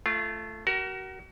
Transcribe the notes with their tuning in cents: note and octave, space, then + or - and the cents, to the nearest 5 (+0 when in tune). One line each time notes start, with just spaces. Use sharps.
A3 +0 F4 -25
F#4 +35 A#4 +15